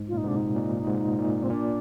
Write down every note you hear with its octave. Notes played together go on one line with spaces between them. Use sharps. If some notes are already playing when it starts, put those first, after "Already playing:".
Already playing: G#2
F4
A#2 D#4
G#2 C3 D4
D#4
A#2
G#2
A#2
C4
A#2 D4